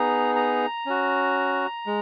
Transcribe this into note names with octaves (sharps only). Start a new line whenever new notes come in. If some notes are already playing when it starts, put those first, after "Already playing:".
Already playing: B3 D#4 G#4 A#5
A#5
C#4 F#4
G#3